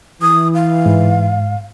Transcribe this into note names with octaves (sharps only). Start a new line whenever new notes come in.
E3 D#6
F5
G#2